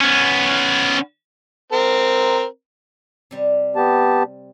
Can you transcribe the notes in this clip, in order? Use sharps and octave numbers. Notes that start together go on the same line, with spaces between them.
B3 C#4
C4 A#4
C3 G3
B3 G4 A5